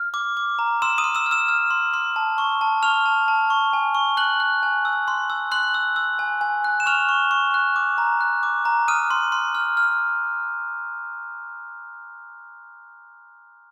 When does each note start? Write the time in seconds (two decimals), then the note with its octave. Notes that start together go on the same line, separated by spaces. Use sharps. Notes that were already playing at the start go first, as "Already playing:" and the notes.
Already playing: F6
0.14 D6
0.37 D6
0.59 A#5
0.82 C6 E6 E7
0.98 D#6 D#7
1.04 C6
1.15 E6 E7
1.26 F6
1.31 E6 E7
1.48 F6
1.70 C6
1.94 C6
2.16 A5
2.38 C#6
2.61 A5
2.82 C#6 F6 F7
3.06 A5
3.28 A5
3.50 C#6
3.73 G#5
3.95 C#6
4.17 F#6 F#7
4.40 F#6
4.63 G#5
4.85 E6
5.08 C6
5.30 E6
5.51 C6 F#6 F#7
5.74 E6
5.96 E6
6.19 G#5
6.41 G#5
6.64 F#6
6.80 E7
6.86 C#6 F6 F7
7.09 C#6
7.31 C#6
7.54 F#6
7.76 D6
7.98 A#5
8.21 F#6
8.43 D6
8.65 A#5
8.88 D#6 F6 D#7
9.11 C6
9.32 C6
9.55 F6
9.77 F6